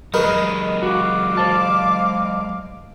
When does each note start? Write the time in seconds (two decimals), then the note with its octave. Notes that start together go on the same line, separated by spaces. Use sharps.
0.14 F#3 G#3 D#4 A#4 B4
0.83 F#4 F5 D6
1.37 C5 A5